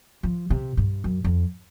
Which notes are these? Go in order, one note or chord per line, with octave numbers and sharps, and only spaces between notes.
F3
C3
G2
F#2
F2